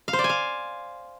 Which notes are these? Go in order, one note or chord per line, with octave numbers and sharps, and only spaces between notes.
F5
C5
D5
G#5
F5